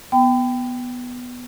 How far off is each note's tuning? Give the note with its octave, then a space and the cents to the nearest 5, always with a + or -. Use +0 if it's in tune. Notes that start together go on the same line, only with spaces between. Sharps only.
B3 +0 G5 +0 B5 +40